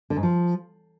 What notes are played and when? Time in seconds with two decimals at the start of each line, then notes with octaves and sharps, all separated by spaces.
0.10 D3
0.17 G#2
0.23 F3